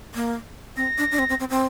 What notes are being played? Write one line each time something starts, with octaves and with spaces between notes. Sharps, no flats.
A#3
C4 A#6
D4
D4
C4
C4
C4
C4